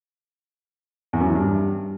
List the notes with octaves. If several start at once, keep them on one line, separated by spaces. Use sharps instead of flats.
E2
F#2
E3
G2